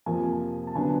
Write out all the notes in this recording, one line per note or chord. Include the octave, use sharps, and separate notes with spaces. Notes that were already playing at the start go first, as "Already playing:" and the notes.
F2 C3 F3 A#3 G#5
A5
D3 F#3 B3 D4 G#5